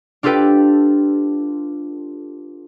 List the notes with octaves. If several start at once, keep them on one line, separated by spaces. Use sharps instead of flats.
D4 F4 G4 A4 B4 G5